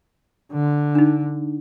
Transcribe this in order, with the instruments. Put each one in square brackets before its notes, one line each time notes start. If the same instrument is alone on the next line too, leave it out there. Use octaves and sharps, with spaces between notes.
[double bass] D3
[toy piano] D4 D#4